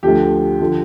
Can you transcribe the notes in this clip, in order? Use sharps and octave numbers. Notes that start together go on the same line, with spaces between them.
D2 D3 F3 G4
D3 F3